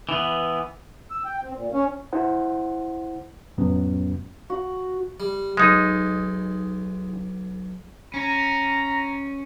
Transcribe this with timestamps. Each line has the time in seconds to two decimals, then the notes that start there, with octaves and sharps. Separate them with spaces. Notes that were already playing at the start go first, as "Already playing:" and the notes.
0.09 E3 B3
1.11 E6
1.25 G5
1.43 C4
1.56 A#2
1.73 C#4
2.13 E4 C5 F#5
3.58 F2 A2 F#3 B3 C#4
4.50 F#4
5.20 G3
5.57 B1 G#3 D#4
8.14 C#4 A#5